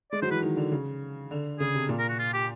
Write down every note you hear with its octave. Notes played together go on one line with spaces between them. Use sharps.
G#3 D5
F#3 C5
E3 B4
D#3
D3
C#3
D3
C#3 G#4
C3
A#2
A#4
F#4
F4
G4